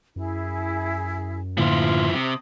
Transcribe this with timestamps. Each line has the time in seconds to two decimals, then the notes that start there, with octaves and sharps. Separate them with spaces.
0.16 F#2 E4 G#4
1.58 A2 D3 F3 A#3 E4 F4 C6
2.14 C3 D#6